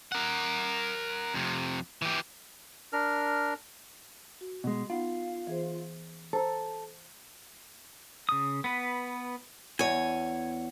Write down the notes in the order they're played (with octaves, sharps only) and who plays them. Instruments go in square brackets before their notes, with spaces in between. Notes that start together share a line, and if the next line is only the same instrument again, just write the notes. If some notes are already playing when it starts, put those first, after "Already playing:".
[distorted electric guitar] A#4 F#5
F2 C3
E3 G4
[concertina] D4 A#4 F6
[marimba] F#4
[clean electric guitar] B2 G#3
[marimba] B3 D#4 F#5 [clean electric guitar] F4
[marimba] E3 G#4 C5
[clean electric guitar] A4 [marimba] C5 A#5 E6
[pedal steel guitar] C#3 D#6
B3 B4
[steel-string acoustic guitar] E2 C#5 [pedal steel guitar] G#5